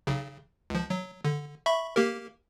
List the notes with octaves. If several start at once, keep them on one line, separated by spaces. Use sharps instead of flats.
B1 C#3
C#2 F3
F#3
D3
E5 B5 C#6
A#3 G4 A#4